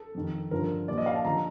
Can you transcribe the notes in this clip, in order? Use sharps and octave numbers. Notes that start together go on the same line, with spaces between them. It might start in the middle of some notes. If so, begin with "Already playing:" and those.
Already playing: A4
F2 D#3
G2 D3 F3 A#4
A#2 F3 D5
D#5
F5
A5
D3 F3 A#5